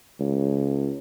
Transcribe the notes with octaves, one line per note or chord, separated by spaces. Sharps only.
C#2